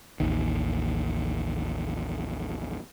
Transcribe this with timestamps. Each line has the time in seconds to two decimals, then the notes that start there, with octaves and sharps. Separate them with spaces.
0.20 A1 D#2 D#3